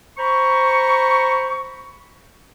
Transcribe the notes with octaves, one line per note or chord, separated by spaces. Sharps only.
C5 A#5 B5 C#6